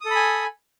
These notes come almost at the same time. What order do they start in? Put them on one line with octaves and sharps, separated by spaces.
D#6 A4 B5 G#5